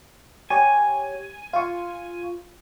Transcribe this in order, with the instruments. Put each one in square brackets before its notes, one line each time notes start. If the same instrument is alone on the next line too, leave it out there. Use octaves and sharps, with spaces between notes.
[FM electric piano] G4 C#5 [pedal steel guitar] G#5
[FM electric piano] F4 [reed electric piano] F5 C#6